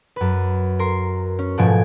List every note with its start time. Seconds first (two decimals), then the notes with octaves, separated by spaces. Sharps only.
0.16 F#2 B4
0.79 A#4 C6
1.39 C#4
1.58 G#2 B2 F3 A3 G#5 D7